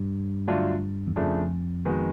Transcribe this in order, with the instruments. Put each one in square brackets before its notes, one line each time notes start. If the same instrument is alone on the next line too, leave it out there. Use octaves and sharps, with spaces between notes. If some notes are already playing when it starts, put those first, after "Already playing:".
Already playing: [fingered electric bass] G2
[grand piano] D3 F#3 A3 D4 F4
[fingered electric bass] E2
[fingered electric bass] F2 [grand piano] C#3 F3 A3 D4
[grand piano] D#3 G#3 B3 D#4 F#4